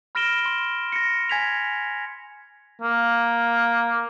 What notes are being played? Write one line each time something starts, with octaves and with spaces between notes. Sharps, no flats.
B5 F6 A#6 D7 E7 G7
C6
A#6 C#7
G#5 G#6 B6 F7
A#3